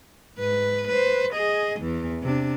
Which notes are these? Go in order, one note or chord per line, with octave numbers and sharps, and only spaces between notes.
G#2 B4
B4 C5
G#4 D#5
E2 E3
C3 D4